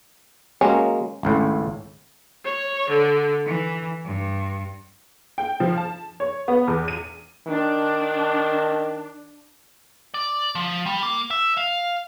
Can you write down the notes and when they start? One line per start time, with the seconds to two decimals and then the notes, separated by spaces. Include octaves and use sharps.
0.61 F#3 G#3 A#3 C#4
1.23 G#1 C#2 A2
2.46 C#5
2.90 D3
3.46 E3
4.05 G2
5.38 G5
5.60 F3
5.78 A5
6.20 C#5
6.48 B3
6.68 E2
6.88 D#7
7.48 D#3 D4
10.14 D5
10.55 F3
10.86 G3
11.03 A#3
11.31 E5
11.57 F5